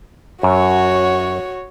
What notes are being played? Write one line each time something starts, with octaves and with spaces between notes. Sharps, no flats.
F#2 F#4 C#5